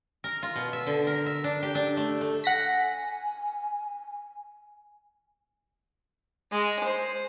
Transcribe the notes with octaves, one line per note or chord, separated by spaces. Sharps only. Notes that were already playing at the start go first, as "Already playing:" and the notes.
A#4
F4
B2
E5
D3
A#4
E5
D4
G4
D4
A3
A3
F#5 G#5 A#6 B6
G#3
C5